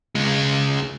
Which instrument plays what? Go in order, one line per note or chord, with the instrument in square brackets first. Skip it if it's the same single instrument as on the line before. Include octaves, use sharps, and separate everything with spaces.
[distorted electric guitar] C#2 G#3